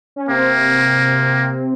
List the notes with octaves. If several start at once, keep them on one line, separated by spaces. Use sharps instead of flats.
C#4
C3 A#3 C4